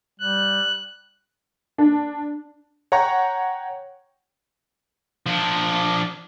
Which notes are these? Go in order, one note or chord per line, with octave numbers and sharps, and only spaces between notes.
G3 F#6
D4
C#5 F#5 G5 A#5 C#6
F3 D4